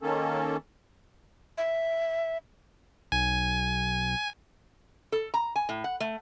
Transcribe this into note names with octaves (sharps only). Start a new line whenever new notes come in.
D#3 A#3 C#4 A4
E5
B1 G#5
A4
A#5
G#5
A2
F#5
A3